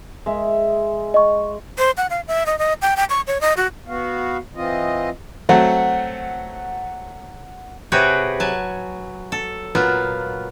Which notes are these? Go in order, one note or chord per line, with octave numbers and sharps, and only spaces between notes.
G#3 E5
D#5 C#6
C5
F#5
F5
E5
D#5
D#5
G5
G5
C#6
C#5
D#5
F#4
B3 F#4 F5
E3 C4 F4 D#5
F#3 A3 C4 F#5
C3 F#4 G#4 B4 C#5 G5
F#3 G#5 A5
A4
A#2 F#3 B3 F4